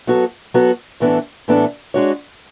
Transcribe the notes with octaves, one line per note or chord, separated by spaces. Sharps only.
F#3 B3 F#4 A4
F#3 B3 F#4 A4
A2 E3 B3 D4 A4
A2 E3 B3 D4 A4
G#3 D4 F#4 C#5